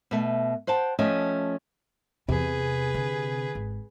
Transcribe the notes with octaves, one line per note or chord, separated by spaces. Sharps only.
B2 A3
C5 F#5 G5 A5
F3 A3 C#4 G4 D#5
E2 C3 G#4 B4
D3
G#1